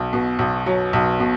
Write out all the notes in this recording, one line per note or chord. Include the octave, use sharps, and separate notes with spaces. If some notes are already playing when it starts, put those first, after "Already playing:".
Already playing: B1
B2
B1
F#3
B1
B2